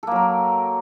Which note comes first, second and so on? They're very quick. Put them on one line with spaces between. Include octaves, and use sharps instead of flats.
A4 A#3 F#3 A#4